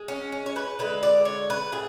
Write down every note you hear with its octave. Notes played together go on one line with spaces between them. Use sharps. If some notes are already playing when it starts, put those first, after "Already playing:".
Already playing: G#3
C#4
C#4
C#5
B4
D3 G#3 B4
D5
C#5
B4
A2 G#4